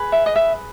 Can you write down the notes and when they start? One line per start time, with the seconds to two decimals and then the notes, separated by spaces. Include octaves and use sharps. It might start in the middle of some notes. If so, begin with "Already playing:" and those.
Already playing: G#4 B4
0.12 E5
0.26 D#5
0.36 E5